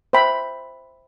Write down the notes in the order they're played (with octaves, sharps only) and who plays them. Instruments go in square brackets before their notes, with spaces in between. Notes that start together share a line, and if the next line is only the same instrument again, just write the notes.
[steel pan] C5 E5 G5 B5